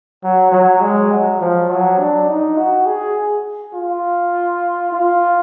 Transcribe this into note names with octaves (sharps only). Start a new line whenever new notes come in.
F#3
F#3
G#3
F#3
F3
F#3
D4
D#4
F#4
G#4
F4
F4